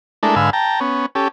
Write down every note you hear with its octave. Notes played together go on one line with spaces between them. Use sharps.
G#3 A3 D4 E4 A4 A#4
G#2 D3 B4 F5 G#5 E6
G5 A5 A#5
B3 C#4
C#4 G4 A4